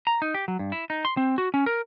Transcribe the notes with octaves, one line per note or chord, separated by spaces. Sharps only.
A#5
D#4
G4
F#3
G2
E4
D#4
C6
C4
F#4
C#4
A#4